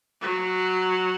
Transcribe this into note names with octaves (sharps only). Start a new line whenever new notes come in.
F#3